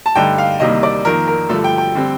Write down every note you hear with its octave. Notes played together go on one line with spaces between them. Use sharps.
A5
G2 D3 A3 D#4 G5
F5
C2 C3 D#3 G3 A#3 D#5
D5
F2 D#3 A#3 A#4
A#4
G2 D3 F3 A3 A4
G5
G5
D3 G3 C4